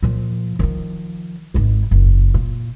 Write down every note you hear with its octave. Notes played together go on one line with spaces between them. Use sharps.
A#2 F3
D#3 F3
G#1 G#3
F#1
A#2